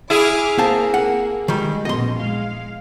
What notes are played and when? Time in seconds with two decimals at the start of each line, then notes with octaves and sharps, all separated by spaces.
0.10 E4 G#4 D6 F6
0.58 A#3 C4 F5 A5
0.94 F#5
1.48 D#3 G3 G#3
1.85 A#1 F#2 B2 D#5 C6
2.20 G#3 F5